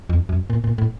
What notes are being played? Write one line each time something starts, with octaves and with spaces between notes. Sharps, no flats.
F2
F#2
A#2
A#2
A2